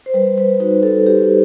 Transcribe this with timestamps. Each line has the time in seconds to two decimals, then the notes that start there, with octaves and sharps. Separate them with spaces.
0.06 C5
0.14 G3 B4
0.38 B4
0.60 D#4 F#4 B4
0.83 A4
1.06 G3 G4